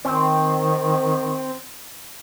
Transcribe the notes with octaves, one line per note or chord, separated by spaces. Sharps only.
D#3 C4